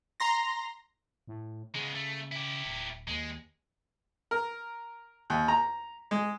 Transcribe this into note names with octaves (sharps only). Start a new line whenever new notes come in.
A#5 C6 A#6
A2
C#3 G#3 B3
A3
E4 G4
D1
D#2 G#3
A#4
D#2
A#5
G#3